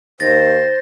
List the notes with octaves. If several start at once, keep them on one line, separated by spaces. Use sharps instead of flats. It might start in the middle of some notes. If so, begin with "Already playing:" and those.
D#2 C5 A6 A#6